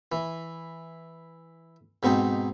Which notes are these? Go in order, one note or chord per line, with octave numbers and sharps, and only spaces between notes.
E3
G#2 B2 C4 D#4